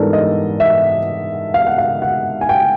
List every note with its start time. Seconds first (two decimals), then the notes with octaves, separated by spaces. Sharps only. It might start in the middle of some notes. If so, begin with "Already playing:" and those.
Already playing: G#2 E3 G3 B3 D4 A4 A#4
0.13 D#5
0.60 E5
1.54 F5
1.67 F#5
1.78 F5
2.02 F#5
2.41 G#5
2.49 G5